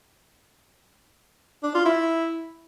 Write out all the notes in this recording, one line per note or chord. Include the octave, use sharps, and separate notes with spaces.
D4
F4
E4